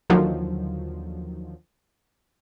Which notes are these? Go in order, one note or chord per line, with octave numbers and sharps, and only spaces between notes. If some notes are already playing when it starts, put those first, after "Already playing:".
D#2 D3 D#3 F3 F#3